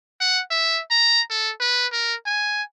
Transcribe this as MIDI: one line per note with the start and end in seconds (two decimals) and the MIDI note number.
0.21 0.41 78
0.51 0.81 76
0.91 1.21 82
1.30 1.51 69
1.60 1.87 71
1.93 2.15 70
2.26 2.63 80